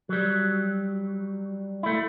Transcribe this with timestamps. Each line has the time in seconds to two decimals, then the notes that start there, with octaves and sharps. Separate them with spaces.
0.09 F#3 G3
1.83 A3 E4